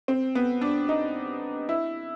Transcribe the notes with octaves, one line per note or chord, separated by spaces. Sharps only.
C4
B3
D4
D#4
E4